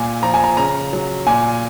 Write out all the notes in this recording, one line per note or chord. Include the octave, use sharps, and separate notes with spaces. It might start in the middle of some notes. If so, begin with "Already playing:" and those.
Already playing: A#2 G#5
F3 A#5
G#5
A#5
C#3 A#5
F#3
A#2 G#5